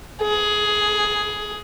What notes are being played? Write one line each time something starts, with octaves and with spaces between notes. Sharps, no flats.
G#4